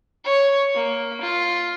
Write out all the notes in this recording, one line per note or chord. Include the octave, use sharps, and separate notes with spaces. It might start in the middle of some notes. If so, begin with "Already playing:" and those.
C#5
A#3
F4